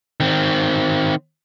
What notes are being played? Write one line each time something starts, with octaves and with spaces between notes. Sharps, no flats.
D#3 C4